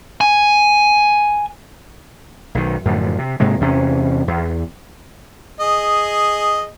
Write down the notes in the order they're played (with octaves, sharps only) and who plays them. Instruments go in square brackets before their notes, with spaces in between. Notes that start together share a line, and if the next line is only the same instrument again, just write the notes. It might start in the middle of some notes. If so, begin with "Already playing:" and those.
[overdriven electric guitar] G#5
[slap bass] B1 D#3
F#2 A2 D3 F3
C3
G#2 C3 G#3 A#3
E2 C3 C#4
E2
[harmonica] G#4 D#5